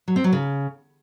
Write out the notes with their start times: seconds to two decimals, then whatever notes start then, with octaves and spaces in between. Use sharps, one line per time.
0.08 F#3
0.16 C4
0.24 F#3
0.32 C#3